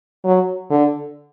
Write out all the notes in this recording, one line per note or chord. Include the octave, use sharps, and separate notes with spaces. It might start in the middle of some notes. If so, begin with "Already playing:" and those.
F#3
D3